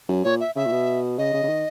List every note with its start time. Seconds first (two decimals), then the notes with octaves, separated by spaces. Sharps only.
0.09 F#2
0.24 A#2 C#5
0.40 E5
0.56 C#3 E5
0.66 A#2
0.71 B2
1.18 C#3 D#5
1.33 C#3
1.43 C#3
1.49 D#3